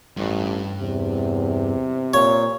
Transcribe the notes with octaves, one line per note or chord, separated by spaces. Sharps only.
A1 G2
E2 C3
A#2 C#5